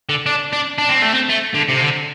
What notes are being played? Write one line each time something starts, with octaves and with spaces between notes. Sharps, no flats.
D3
D4
D4
D4
C4
A3
C4
A3
D3
C3
D3